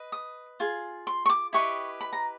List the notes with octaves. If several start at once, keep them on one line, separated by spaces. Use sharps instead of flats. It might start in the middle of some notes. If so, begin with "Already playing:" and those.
Already playing: B4 D#5
D#6
F4 G#4
C6
C#6
D6
E4 G4 B4 D#5 C#6
B5
A#5